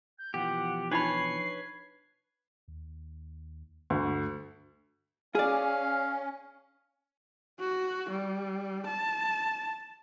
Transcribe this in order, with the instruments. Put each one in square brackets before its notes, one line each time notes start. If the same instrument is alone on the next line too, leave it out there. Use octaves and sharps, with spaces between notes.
[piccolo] G6
[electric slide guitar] B2 E3 F3 [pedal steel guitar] G4 [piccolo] F#5
[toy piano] D4 D#4 B5 [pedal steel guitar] B4 C#5 [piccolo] C7
[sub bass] D#2
[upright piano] D2 [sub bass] G2
[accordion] C#4 [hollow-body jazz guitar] G#4 D5 [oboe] F5
[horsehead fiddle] F#4
G3
A5